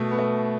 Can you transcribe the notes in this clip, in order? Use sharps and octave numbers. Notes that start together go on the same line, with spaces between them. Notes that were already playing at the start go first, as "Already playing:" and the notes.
Already playing: B2 A3
B3
A3